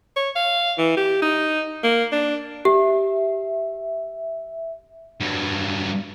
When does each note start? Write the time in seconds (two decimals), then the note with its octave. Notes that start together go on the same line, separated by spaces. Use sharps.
0.17 C#5
0.36 F5
0.78 E3
0.97 G4
1.22 D#4
1.84 A#3
2.12 D4
2.65 G4 E5
5.21 G2 F#3